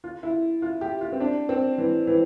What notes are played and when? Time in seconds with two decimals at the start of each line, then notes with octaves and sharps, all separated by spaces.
0.04 F4
0.23 E4
0.62 F4
0.81 G4
1.01 F4
1.12 C4
1.20 D4
1.49 C4
1.78 E3
2.07 E3